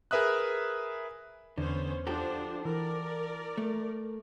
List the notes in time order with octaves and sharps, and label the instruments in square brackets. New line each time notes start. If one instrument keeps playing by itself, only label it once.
[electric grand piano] G#4 A#4 B4 E5 D#6 F#6
[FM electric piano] E2 [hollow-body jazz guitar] D3 [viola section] B3 C#4 C5
[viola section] F3 D4 C5 [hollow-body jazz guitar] F#4 G4 A4
[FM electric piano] E3 [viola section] A#4 D5
[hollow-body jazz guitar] A3